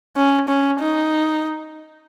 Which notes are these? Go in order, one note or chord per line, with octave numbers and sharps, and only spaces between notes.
C#4
C#4
D#4